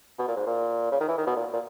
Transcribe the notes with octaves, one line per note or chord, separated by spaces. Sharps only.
B2
A#2
G#2
A#2
C#3
D#3
E3
D#3
B2
A#2
A#2